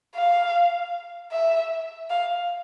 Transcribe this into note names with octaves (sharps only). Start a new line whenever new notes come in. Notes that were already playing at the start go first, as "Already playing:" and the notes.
F5
E5
F5